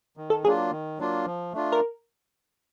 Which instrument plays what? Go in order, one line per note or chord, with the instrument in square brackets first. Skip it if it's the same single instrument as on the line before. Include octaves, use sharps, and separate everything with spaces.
[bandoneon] D#3
[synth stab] A4
[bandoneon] F#3 A#3 D4 F4 [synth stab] G#4
[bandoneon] D#3
F#3 A#3 D4 F4
F3
A3 D4 F4
[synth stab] A#4